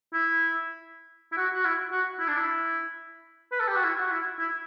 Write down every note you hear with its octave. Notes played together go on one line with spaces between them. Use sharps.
E4
E4
F#4
F#4
E4
F#4
E4
D4
E4
B4
A4
G4
F#4
E4
F#4
E4
E4